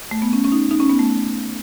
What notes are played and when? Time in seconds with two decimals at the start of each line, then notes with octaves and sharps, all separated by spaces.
0.11 A3
0.22 B3
0.33 C#4
0.44 C#4
0.52 D#4
0.71 D#4
0.80 C#4
0.90 B3
0.99 A3